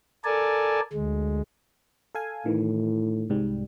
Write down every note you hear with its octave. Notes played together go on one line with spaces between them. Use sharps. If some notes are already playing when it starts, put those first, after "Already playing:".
A4 A#4 D5 G#5 A5
D2 G#3
A4 F5 G#5
A2 D#3 E3
C2 G#2 G3